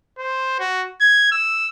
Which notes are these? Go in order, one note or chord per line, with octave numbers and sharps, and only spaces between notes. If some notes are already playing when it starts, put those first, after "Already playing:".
C5
F#4
G#6
E6